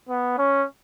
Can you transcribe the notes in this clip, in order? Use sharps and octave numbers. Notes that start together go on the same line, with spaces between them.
B3
C#4